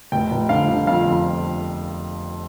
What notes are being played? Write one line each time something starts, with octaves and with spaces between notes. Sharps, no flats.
F1 G5
F1
D3 F5
D3
F2 F5
F2